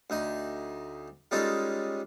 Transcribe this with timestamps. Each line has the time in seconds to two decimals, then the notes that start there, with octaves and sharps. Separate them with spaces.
0.10 D2 D#4 C6
1.31 G3 G#3 C#4 D#4 F4 A4